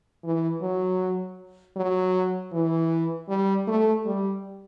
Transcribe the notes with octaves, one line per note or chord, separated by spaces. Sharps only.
E3
F#3
F#3
E3
G3
A3
G3